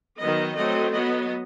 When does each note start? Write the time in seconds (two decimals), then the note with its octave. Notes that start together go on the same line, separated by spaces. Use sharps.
0.21 D#3 F#3 B3 D#5
0.57 F#3 A3 C4 D#5
0.94 F#3 B3 D#5